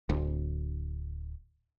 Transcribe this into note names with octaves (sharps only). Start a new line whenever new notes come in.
D1 D2